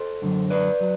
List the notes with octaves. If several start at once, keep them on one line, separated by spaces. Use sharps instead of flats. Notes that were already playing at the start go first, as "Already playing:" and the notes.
Already playing: A4 C5
F#2 D3 F#3
B4 D5
F#3